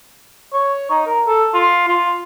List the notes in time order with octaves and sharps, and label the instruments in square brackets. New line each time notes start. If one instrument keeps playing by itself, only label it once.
[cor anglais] C#5
D#4
A#4
A4
F4
F4